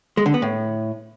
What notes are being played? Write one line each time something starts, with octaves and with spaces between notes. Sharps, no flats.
G#3
D3
B3
A2